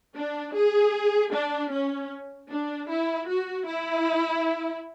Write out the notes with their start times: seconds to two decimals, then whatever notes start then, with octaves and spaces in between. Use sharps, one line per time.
0.16 D4
0.55 G#4
1.33 D4
1.72 C#4
2.50 D4
2.90 E4
3.29 F#4
3.67 E4